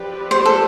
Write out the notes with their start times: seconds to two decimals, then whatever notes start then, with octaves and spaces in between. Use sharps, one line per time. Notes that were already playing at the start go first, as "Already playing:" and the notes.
Already playing: F3 C4 G4 B4 D5
0.31 C5
0.46 A4